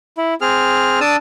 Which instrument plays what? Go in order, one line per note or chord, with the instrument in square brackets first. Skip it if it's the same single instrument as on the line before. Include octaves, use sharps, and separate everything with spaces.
[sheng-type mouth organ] E4
C4 G#4 F6
D4 A5 D#6 E6